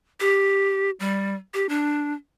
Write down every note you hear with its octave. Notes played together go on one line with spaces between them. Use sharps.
G4
G3
G4
D4